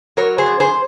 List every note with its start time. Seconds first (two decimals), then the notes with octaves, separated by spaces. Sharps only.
0.17 F#3 A#4 C#5
0.38 G#4 C5
0.46 F#2
0.60 G#4 C5